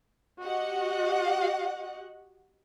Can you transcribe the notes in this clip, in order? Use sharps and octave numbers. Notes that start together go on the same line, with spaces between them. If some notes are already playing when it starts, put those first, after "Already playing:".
F#4 G4 D#5 F#5